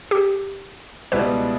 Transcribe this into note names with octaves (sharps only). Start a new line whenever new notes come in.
G4
C#2 B2 G3 B3 E4 B4